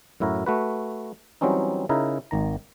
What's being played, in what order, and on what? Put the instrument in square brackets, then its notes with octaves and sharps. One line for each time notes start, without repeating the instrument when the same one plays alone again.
[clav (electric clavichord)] F#2 A2 E4 F#4 A#4
A3 F#4 B4
E3 F#3 G3 C4 C#4 D#4
C#3 D#4 E4 A#4
G#1 D#3 A#5